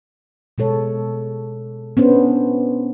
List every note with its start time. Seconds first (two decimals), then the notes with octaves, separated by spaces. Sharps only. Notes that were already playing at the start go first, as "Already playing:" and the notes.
0.58 B2 G#3 A4 C#5
1.97 B3 C#4 D4 C5